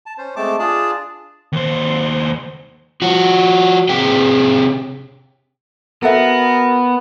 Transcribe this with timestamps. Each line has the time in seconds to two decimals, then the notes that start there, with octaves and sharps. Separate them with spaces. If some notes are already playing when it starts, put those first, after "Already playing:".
0.06 A5
0.18 C#4 C5
0.36 G#3 A3 C4 A5 D6
0.59 D4 F4 G#4 D5 A5
1.52 D#2 C5
3.02 F3 F#4
3.89 C3 G#4 G5
6.02 B3 F#4 A4 A#4 E5